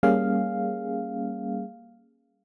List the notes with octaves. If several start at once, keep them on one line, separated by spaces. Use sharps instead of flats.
G3 A#3 C#4 G#4 F5